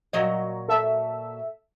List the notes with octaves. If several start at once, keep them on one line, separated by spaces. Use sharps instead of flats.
A#2 F#3 D#5
A4 E5